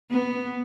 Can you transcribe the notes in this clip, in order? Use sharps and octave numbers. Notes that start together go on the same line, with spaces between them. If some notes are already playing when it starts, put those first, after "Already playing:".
B3